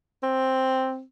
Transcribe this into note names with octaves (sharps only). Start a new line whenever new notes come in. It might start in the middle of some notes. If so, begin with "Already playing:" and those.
C4